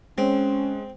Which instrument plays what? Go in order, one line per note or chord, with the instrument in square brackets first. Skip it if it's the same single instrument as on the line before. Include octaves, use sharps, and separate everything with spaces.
[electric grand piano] G#3 [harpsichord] C4 [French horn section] C#4